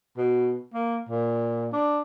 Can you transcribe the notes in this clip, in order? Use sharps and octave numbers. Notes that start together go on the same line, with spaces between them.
B2
A#3
A#2
D4